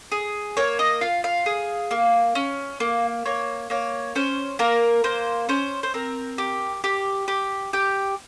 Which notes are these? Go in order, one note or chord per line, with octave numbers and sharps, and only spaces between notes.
G#4
A#3 C#5
D#5
F4 F5
F5
G#4
A#3
C#4
A#3
A#3 C#5
A#3 C#5
C#4 C5
A#3 A#4
A#3 C5
C#4 C5
C5
C4 A#4
G4
G4
G4
G4 G5